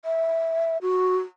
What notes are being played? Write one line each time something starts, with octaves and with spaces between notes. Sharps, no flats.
E5
F#4